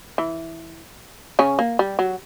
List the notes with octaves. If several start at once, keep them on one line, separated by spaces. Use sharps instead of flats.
E3
C#3 C#4
A#3
G3
F#3